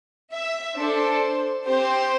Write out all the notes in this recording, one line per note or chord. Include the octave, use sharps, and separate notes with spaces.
E5
D4 A4 C5
C4 G4 C5